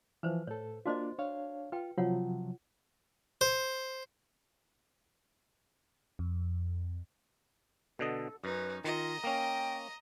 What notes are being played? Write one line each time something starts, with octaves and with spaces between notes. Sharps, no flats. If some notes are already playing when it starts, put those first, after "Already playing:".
E3 F3 B4 C5
A2 A4 C#5
A#3 D4 F4 F#4 C5 D#5
D4 C#5 F5
F4 B4 G5
C3 F3 F#3 F4 C#5 F#5
C5
F2
B2 D3 A4 D#5
F#2 C#4 D#4 B4
D#3 F4 D#5 A#5
A#3 C#4 G5